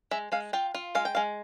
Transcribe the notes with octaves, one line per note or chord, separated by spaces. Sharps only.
G#3 E5
G#3 F5
F4 G5
F4
G#3 F5
G5
G#3 F5